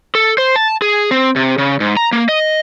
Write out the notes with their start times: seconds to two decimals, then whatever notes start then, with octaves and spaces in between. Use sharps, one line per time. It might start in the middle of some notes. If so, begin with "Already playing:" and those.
0.15 A4
0.38 C5
0.56 A5
0.82 G#4
1.11 C4
1.36 C3
1.58 C#3
1.80 G#2
1.97 A#5
2.12 A#3
2.29 D#5